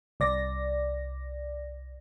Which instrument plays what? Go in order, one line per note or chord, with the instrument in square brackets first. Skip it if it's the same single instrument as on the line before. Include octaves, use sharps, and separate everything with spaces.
[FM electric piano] C2 D5 A#6